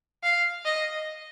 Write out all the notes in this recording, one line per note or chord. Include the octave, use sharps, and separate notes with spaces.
F5
D#5